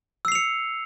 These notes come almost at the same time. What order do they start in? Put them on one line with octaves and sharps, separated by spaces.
E6 C7 F7 C#7